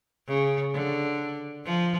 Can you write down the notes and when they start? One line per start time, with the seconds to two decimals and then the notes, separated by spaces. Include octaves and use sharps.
0.28 C#3
0.73 D3
1.65 F3